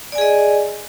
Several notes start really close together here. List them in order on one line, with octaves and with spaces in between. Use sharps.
D5 G#5 G#4 D#5